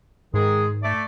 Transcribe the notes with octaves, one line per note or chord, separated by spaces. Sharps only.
G#2 D#3 G#3 G#4
A3 D5